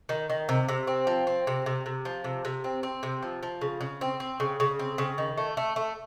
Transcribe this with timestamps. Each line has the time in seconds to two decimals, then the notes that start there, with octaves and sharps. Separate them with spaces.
0.09 D#3
0.30 D#3
0.49 C3
0.69 C3
0.87 C4
1.07 F3
1.27 C4
1.47 C3
1.66 C3
1.86 C3
2.05 F3
2.24 C3
2.45 C3
2.64 C4
2.83 C4
3.03 C3
3.23 F3
3.43 F3
3.61 C#3
3.81 C#3
4.01 C4
4.20 C4
4.40 C#3
4.60 C#3
4.79 C4
4.98 C#3
5.18 D#3
5.37 A3
5.57 A3
5.76 A3